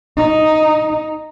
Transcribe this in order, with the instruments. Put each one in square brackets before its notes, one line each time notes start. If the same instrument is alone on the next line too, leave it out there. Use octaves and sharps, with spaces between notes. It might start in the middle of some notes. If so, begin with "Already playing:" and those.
[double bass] D#4